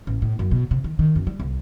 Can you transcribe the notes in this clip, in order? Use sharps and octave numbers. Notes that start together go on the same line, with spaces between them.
A1
A2
F#2
B2
C3
D#3
D#3
F#2
G3
C2